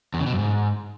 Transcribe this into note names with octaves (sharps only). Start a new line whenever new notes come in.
E2
C#3
B2
F#2
G#2